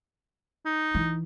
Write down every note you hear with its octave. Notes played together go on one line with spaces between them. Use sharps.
D#4
E3